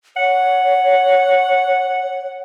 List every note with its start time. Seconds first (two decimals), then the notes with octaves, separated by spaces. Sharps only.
0.17 C#5 F#5